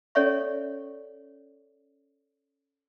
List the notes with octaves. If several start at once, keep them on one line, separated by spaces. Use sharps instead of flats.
C#4 A4 C#5 D5 E5 C#6